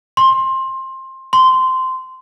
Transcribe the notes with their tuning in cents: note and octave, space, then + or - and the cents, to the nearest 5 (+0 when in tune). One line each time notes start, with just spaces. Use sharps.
C6 +20
C6 -15